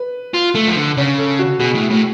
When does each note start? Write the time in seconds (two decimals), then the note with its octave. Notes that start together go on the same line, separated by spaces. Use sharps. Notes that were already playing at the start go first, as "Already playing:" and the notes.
Already playing: B4
0.34 F4
0.55 A3
0.68 F3
0.76 D3
0.97 C#3 C#5
1.18 A4
1.39 F#4
1.60 B2 G#4
1.75 A2
1.91 A2